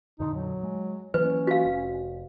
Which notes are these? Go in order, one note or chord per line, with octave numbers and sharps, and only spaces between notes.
F2 A#2 D3 D#4
F#3
G#3
E3 F#3 A#3 C#4 B4
F#4 F5
F1